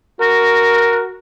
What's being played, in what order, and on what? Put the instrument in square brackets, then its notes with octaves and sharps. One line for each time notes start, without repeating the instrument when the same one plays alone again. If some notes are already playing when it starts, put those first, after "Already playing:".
[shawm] F#4 [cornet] A#4